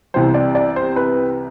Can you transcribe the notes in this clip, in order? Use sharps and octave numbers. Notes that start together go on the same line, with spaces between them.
C2 C3 E3 G3 C5
D5
D5
C5
B4